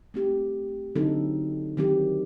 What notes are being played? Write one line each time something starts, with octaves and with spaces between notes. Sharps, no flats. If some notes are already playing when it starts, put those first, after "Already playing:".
A3 C4 G4
D3 F#3 C4 D#4 A4
D#3 F#3 C4 G4